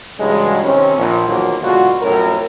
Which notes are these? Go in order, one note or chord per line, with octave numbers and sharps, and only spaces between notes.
G2 C#3 E3 F#3 G#3
C3 D#3 C4 C#4
A#1
B1 E2 D#3 F3 F#3 A#3
B2 D3 F#3 G#3 F4 F#4
F2 A2 F#3 C#4 A#4